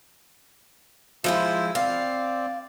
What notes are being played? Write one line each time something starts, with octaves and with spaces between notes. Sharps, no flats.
F3 G#3 E4 C5 E5
C4 D5 F5